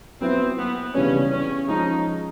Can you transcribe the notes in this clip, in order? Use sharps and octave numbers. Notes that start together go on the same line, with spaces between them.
F#3 B3 C4 E4
B3
C#3 E3 G3 B3 C#4 D4
C#4
F3 G#3 C#4 D#4